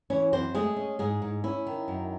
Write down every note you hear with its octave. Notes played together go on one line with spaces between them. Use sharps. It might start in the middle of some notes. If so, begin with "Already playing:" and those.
E3 C#4 C#5
F#2 C4 C5
G#3 A3 G#4
C#4
G#2 G#3 G#4
G#2
C#4 E4
D#3
F#2